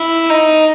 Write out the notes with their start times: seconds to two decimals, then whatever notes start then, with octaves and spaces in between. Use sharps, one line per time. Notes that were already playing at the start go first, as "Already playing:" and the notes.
Already playing: E4
0.29 D#4